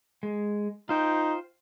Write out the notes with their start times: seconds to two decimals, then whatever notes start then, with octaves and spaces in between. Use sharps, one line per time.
0.23 G#3
0.89 D#4 F4 C5 G5